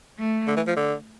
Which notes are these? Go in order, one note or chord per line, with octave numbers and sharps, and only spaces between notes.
A3
D3
E3
F3
D3